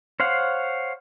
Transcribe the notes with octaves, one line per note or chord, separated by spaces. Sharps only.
C5 C#5 F5 F#5